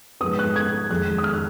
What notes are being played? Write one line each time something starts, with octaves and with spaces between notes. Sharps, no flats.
G#2 F3 G#3 B3 D#6
F#6
G#6
F2 D#3 G#3 F#6
D#6
F6
F#6